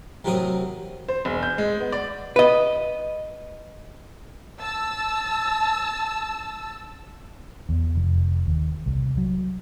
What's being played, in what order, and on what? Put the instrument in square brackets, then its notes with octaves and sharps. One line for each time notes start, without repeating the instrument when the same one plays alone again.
[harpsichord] A1 C3 F#3 C4 A#4 D#6
[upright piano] C5
E1
G6
G#3
B3
D5
[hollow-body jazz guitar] B4 D#5
[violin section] A5 E6
[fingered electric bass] E2
F1
D#2
C2
F#3